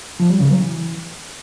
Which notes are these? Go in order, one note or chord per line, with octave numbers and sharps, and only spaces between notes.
F3
G3
C#3
F#3
E3